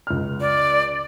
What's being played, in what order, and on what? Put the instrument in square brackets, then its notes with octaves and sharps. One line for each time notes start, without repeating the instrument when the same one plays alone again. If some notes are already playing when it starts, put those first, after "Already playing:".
[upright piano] C#2 F6
[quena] D5